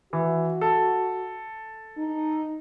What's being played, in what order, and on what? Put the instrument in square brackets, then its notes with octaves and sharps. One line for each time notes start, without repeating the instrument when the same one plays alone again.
[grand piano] E3 [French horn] F#4
[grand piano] A4
[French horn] D#4